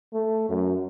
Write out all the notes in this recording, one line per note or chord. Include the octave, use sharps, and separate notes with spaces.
A3
F#2